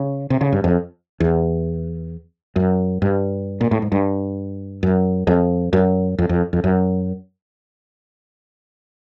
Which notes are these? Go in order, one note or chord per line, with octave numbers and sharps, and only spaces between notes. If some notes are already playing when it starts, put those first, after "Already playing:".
Already playing: C#3
C3
C#3
G2
F2
E2
F#2
G2
A#2
A2
G#2
G2
F#2
F2
F#2
F2
F2
F2
F#2